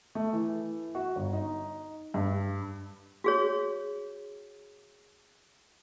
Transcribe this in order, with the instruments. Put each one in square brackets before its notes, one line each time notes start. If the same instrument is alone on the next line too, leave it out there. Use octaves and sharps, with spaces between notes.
[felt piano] A3
E3
F#4
G1
D#4
G2
[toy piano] F#4 G#4 C#5